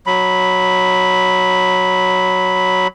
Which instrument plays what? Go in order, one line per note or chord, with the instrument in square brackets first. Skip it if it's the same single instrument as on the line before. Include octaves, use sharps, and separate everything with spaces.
[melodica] F#3 B5